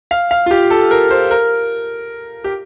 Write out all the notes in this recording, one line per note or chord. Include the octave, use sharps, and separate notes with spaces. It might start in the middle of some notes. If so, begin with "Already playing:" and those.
F5
F5
F4
G4
A4
A#4
C5
A#4
G4